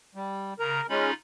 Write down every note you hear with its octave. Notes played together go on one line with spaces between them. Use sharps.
G3
C#3 A#4 A#5
G#3 C#4 D#4 F4 B5